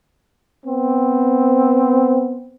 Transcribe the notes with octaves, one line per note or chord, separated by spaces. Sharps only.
B3 C4